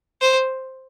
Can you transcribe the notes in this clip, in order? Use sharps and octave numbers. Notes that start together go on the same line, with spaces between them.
C5